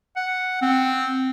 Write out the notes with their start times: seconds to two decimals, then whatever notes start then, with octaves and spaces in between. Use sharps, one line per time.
0.16 F#5
0.62 C4